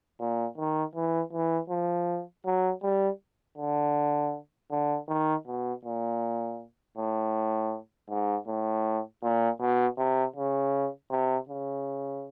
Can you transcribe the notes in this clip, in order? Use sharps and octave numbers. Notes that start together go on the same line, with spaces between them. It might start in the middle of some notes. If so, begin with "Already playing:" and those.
A#2
D#3
E3
E3
F3
F#3
G3
D3
D3
D#3
B2
A#2
A2
G#2
A2
A#2
B2
C3
C#3
C3
C#3